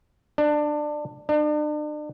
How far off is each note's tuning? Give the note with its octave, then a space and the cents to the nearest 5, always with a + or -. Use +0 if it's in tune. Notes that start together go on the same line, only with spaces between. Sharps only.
D4 +20
D4 +40